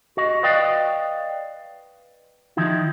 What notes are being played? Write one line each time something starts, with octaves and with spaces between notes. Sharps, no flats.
F#4 D#5
B4 D5 D#5 F5 G5
D#3 F3 D#4 E4